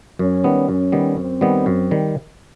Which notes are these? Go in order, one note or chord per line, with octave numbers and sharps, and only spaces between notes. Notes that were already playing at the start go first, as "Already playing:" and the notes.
F#2 C#4
D#3 G3 B3
F#2 C#4
D#3 G3 B3
F#2 C4
D#3 G3 B3
F#2
D#3 G3